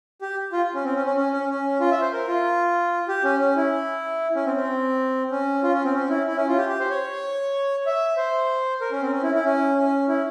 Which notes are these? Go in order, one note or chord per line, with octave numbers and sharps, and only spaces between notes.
G4
F4
C#4
C4
C#4
C#4
C#4
C#4
C#4
F4
E5
C5
A#4
F4
G4
C#4
C#4
E4
C#4
C4
C4
C#4
F4
C#4
C4
C#4
E4
E4
C#4
F4
G4
G4
C5
C#5
E5
C5
A#4
C#4
C4
C#4
E4
E4
C#4
C#4
E4